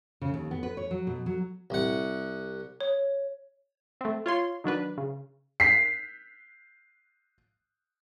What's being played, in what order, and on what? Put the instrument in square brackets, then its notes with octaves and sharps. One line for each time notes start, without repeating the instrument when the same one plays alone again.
[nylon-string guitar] C#3
D#2
B3
B4
C#5
F#3
B2
F#3
[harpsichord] C2 F#5
[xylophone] C#5
[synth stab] A3 C4
F4 C#5 C6
D#3 F#3 D4 B4
C#3
[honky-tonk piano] B6 C7